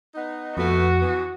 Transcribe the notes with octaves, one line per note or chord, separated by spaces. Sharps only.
B3 D#4
F2 A3 B3 F#4
E3 B3